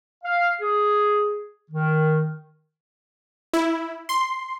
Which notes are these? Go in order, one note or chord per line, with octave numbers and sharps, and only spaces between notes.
F5
G#4
D#3
E4
C6